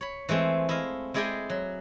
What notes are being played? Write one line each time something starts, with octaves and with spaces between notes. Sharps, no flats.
C#5 B5
E3 G#3 A3 C4
E4 D#5 F5
G#3 E4 G#4 D5 D#5 G5
F#3